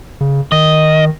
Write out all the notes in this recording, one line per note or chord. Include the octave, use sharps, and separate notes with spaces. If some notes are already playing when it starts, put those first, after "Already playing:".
C#3
D#3 D#5